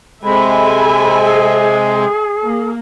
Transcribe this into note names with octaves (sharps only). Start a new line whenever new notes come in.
C3 G#3 A4 E5 G#5 B5
G#4
A#3